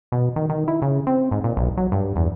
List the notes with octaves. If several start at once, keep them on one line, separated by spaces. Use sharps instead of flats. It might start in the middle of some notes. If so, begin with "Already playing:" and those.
B2
D#3
D#3
E4
C#3
C4
G#2
A#2
B1
F#3
G2
E2